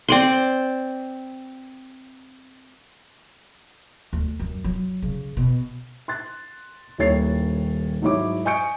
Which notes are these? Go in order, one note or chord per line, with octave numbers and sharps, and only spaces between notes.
C4 D5 C6
D2
F#2
F#3
C#3
B2
C6 F#6 A6
D#1 D#2 E4 C#5 A6 C7
G#2 F#3 D#4 E4 C#5 D6
D#5 G#5 C#6 G6 C#7 D7